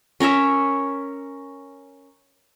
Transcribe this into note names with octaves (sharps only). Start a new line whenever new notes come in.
C#4 A#4 C#5 E5